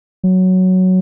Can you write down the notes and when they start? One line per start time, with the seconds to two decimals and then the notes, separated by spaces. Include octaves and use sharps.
0.24 F#3